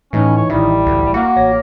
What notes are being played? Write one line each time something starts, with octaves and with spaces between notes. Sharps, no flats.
A2 E3 C#4 D#4
C#5
A1 D#3 G3 E4 E5
D2
A#3 F#4
A1 C#5 A#6